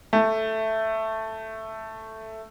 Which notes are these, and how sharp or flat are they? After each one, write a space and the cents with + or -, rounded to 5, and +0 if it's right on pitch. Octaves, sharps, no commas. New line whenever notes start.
A3 +5